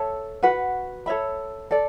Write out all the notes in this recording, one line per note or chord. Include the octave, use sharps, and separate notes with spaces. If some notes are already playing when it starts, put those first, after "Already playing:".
Already playing: A4 C#5 E5 A5
F#4 B4 F#5
A4 C#5 E5 B5
A4 D5